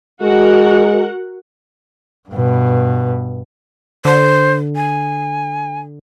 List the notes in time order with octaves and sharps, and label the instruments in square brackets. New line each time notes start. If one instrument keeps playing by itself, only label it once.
[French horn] G#3 [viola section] F#4 A#4 F#5
[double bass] G2 B2
[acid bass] D3 [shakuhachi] C5
[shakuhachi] G#5